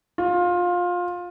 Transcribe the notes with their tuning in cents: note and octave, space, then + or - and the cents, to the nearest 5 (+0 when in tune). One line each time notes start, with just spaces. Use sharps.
F4 +20